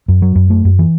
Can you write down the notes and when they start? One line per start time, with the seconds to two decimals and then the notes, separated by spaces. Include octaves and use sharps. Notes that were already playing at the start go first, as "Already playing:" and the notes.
0.08 F#2
0.22 F#3
0.36 F#2
0.50 A3
0.65 F#2
0.79 E3